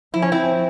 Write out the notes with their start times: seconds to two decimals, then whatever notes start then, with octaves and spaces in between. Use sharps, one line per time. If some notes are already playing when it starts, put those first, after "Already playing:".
0.14 F3 E4
0.22 C#4
0.32 C4 E4